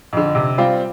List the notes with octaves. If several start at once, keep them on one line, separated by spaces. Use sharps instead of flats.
F2 D3
C3
G3 C4 F4